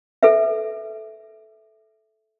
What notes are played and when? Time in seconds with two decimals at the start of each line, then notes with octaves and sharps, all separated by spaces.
0.23 A4 B4 E5